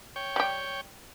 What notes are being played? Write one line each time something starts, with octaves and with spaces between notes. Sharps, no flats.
C#5 G5
G3 G4